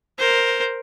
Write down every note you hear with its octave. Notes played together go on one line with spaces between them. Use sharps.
A#4 C5